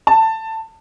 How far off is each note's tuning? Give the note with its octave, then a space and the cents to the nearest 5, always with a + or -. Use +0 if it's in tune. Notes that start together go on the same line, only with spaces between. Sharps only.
A5 +15